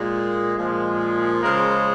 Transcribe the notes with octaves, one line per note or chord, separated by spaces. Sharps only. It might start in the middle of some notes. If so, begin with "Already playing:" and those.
Already playing: A#2 G#3
A#2 F3 G#3
C#3 F3 G#3 A#4